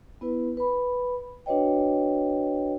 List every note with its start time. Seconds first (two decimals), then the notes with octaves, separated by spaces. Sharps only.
0.21 B3 E4 B4
0.57 B4 B5
1.46 D4 F#4 B4 C#5 D#5 G5